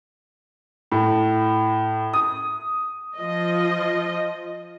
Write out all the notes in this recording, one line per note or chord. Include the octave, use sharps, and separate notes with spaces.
A2
D#6
F3 D#5